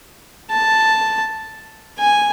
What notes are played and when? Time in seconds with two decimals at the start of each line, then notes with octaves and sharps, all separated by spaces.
0.51 A5
1.98 G#5